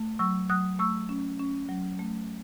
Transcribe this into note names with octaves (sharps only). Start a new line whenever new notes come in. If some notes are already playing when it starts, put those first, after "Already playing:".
Already playing: A3
F#3 C#6 E6
F#3 D#6 F#6
A3 C#6 E6
C#4
C#4
F#3
A3